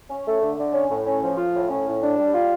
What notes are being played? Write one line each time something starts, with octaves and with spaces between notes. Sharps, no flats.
C#4
A3
D3
D3
C#4
A2
C#4
F3
F4
A2
C#4
A2
D4
G3
F4